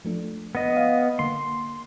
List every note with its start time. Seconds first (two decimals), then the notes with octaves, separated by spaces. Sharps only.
0.05 F3 A3 D4
0.55 B3 D#5
0.77 F5
1.19 D3 A#3 C6